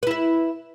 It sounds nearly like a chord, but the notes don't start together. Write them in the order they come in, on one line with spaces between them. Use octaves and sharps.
B4 E4 E5